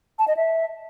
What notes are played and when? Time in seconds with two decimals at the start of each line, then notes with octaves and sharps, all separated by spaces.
0.19 A5
0.28 D#5
0.37 E5